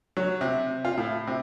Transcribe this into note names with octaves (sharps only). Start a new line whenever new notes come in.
F#3
C3
F4
A2
C3